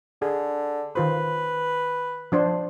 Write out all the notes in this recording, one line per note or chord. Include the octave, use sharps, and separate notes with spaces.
D3 G#4
D#3 F4 B4 C5
F3 D4 C5